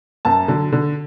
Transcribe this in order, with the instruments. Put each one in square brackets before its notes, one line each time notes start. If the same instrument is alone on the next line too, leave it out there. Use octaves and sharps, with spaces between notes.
[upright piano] F#2 A5
D3 F#3
D3